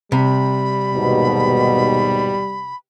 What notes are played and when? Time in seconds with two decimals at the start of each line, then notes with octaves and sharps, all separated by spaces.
0.12 C3 G3 B5
0.94 D#2 G#2 B2